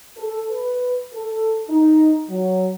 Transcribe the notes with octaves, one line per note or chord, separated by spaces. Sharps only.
A4
B4
A4
D#4
F#3